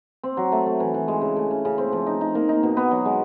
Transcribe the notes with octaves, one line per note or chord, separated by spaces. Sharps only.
C4
F#3
A3
A3
E3
E3
G#3
C#3
A3
C#3
C#3
C4
F3
D#4
D#4
A#3
D#4
B2
B3
F#3
G#3